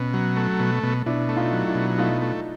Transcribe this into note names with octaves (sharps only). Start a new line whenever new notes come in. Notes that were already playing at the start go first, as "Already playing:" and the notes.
Already playing: B2 C#4
F#3
A3
B2
B2
B2 D4 E4
A3
D#4 F4
F#3
D4 E4
B2
A3 D#4 F4
A3